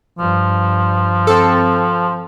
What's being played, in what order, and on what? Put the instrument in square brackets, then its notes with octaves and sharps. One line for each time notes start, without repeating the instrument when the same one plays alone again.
[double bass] G2 [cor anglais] F3
[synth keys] C4 A4